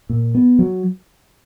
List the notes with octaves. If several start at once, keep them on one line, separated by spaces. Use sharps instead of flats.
A#2
B3
F#3